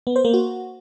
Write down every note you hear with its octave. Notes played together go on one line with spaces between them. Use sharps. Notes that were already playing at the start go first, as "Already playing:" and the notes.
B3
C5
A#3
F#4